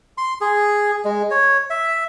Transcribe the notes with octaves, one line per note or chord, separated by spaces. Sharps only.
C6
G#4
G#3
C#5
E5